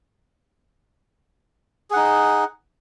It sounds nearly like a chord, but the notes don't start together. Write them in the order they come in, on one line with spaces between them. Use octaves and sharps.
G#4 F#5 D#4